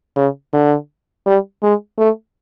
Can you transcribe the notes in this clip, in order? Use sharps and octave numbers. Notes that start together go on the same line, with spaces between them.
C#3
D3
G3
G#3
A3